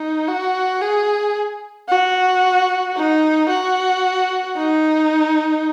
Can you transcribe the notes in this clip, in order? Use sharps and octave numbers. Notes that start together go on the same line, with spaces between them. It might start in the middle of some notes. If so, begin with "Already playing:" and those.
Already playing: D#4
F#4
G#4
F#4
D#4
F#4
D#4